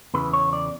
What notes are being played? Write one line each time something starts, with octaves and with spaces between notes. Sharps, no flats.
E2 C#3 E3 B4
C#5
D5